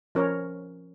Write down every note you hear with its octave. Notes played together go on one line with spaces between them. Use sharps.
F3 C#4 A#4 C#5